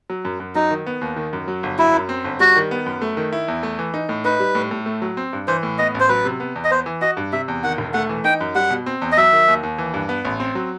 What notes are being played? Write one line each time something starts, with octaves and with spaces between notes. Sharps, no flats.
F#3
F#2
F#2
F#3 D#4
D#3
B3
D#2
D#3
F#2
F#3
G1
F#3 E4
F#2
C4
G1
G3 F#4
D#3
B3
F#2
A3
D#3
E4
E2
A3
E3
D#4
A2
D#4 B4
G3
A2
A2
A3
F#3
C4
G2
E3 C5
A2
B3 D#5
A1
C5
F#3 B4
C3
B3
E2
D#5
B3 C5
E3
F#4 D#5
G2
C3 E5
E2
D#3 F#5
E1
A3 F#5
E3
D#4 G5
F#2
G3 F#5
B2
C4
E2
D#5
F#3 E5
D#3
D#2
D#2
E3
G2
B3
A1
C4
F#3